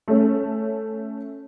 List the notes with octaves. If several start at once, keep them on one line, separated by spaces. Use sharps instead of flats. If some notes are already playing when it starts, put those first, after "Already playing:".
A3 C#4